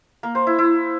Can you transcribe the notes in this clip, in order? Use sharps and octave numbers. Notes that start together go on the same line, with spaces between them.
A#3
C5
E4
E4